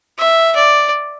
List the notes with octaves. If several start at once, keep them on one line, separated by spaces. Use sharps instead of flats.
E5
D5